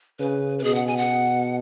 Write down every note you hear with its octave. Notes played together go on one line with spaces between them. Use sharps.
C#3 B4
B4
B2 G#4
F#5
G#5
F#5